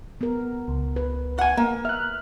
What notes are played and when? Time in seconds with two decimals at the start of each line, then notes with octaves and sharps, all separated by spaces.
0.21 B3 A#4
0.68 C#2
0.96 B4
1.39 F#5 G#5
1.57 A#3
1.85 E5 F6 F#6